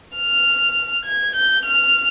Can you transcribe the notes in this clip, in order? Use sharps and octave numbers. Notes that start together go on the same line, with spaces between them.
F6
G#6
G6
F6